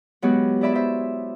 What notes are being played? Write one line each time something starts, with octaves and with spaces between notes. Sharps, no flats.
F#3 G#3 B3 F#4 G4
E4 G#4 D5 E5 B5
C5 E5